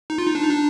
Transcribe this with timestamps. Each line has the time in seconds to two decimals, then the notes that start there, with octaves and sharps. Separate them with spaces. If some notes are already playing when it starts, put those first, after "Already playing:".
0.10 D#4
0.18 F4
0.27 D#4
0.35 D4
0.43 D#4
0.51 D4